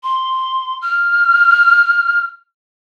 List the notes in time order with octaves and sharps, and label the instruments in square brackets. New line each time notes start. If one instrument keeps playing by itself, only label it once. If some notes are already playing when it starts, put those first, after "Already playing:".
[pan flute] C6
F6